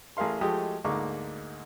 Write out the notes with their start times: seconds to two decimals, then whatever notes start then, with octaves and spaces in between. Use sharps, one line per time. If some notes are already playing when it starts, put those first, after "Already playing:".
0.17 A1 G#4 A#4 F5 C6
0.41 F3 G#3 A3 F#4 G4 D#5
0.84 D2 G#2 A#3 C#6 D6